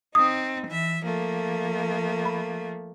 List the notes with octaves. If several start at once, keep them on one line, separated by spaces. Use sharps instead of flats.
C4 D#4 D#6
E3 E5
F3 A3 A#3
B5